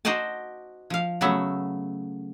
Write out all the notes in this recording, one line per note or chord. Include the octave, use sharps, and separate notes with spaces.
D#4 F#4 C5 D5 D#5 A5
F3 F5
C#3 F#3 A3 B3 E5